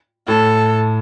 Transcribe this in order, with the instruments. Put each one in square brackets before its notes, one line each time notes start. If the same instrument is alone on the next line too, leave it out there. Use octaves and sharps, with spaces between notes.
[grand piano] A2 [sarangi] A4